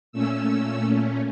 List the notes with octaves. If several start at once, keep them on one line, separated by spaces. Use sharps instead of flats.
A#2 A3 C#4 E6